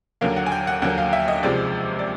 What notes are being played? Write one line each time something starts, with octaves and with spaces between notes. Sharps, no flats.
D#2 D3 F#3 A#3 F5
F#5
G#5
G5
F#5
D#2 D3 F#3 A#3 F#5
F5
E5
D#5
C#2 C3 F3 G#3 D5
D5